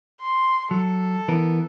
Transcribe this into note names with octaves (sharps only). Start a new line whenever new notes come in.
C6
F#3 A4
E3 B3 A#4